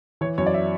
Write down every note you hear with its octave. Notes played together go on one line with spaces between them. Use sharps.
E3 C#5
F#2 C#5
D5
E5